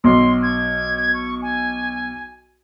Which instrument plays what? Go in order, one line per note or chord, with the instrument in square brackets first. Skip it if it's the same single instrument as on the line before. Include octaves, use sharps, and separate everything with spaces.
[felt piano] B1 F#3 [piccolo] C6
[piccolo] G#6
C#6
G#5